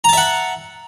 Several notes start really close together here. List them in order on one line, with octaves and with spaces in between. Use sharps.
A#5 A5 E5 F#5